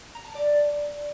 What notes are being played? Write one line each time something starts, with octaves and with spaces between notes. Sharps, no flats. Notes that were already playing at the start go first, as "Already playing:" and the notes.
A#5
A5
D5